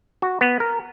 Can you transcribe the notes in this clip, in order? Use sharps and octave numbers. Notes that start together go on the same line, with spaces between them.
F#4
B3
A#4